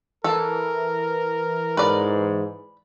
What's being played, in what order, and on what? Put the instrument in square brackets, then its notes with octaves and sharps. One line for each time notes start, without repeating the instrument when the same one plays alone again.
[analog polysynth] E3 [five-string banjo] A4 [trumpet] A#4
[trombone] G#2 [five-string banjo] B4 D5